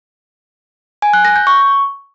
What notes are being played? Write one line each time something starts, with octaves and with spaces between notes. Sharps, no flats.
G#5
F#6
A#6
G6
C#6